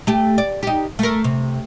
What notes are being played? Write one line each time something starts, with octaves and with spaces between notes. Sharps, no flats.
A3 G4
D5
D#4 G4
A3 A#4
C3